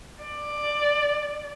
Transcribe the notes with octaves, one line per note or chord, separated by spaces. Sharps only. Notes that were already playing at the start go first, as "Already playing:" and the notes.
D5